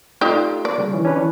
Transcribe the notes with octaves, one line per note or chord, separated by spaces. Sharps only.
A3 D#4 F4 G4 D5 C6
A#3 D5
C#3 G3
E3 C#4
C#4 D4 B4
E3